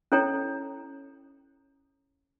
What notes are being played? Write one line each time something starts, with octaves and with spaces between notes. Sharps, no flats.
C#4 E4 A4 C#5 G5 A#5